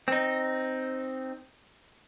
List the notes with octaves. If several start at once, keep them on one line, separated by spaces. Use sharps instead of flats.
C4 D#4